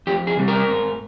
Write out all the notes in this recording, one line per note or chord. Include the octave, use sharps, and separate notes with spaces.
F2 G4
G#4
C3 G3
A#4
G#2